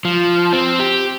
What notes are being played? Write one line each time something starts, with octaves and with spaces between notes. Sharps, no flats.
F3
C4
G4